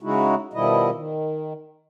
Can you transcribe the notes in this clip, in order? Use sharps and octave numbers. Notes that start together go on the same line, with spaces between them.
C#3 G#3 D#4 E4 F#4
B2 D#3 F3 G3 E4 D#5
D#3